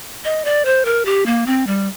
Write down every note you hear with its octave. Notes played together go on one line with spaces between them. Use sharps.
D#5
D5
C5
A#4
G4
A#3
C4
G3